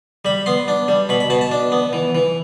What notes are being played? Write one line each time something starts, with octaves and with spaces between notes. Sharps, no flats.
G3 B5
B3 C6
D4
G3
B2 B5
B5
B2 A5
A5
D4
B3
E3
E3